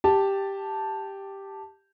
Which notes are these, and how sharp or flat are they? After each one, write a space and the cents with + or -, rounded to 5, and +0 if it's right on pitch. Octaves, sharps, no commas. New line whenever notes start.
G4 +0 A5 +0